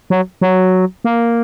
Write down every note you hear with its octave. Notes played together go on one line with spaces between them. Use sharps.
F#3
F#3
A#3